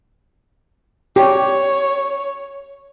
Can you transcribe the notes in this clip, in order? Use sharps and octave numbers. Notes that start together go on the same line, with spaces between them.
G4 C#5